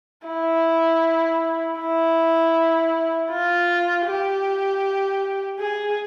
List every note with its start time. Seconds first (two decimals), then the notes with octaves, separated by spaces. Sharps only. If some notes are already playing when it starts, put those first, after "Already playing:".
0.27 E4
1.79 E4
3.31 F4
4.06 G4
5.60 G#4